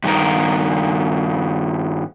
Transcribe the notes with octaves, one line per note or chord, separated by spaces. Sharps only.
G2 D#3 A#4